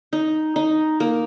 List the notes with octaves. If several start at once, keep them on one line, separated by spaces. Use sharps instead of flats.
D#4
D#4
A#3